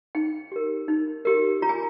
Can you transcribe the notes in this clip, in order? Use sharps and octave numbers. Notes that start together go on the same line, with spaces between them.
D#4 G5
G4 A#4
D#4
G4 A#4
F4 A#5
G#5